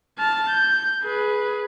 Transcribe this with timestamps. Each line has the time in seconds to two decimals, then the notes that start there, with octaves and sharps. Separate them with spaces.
0.19 A5 F6
0.49 G6
1.03 G#4 B4